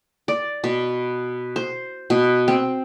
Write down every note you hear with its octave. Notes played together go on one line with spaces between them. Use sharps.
D5
B2
C5
B2
C4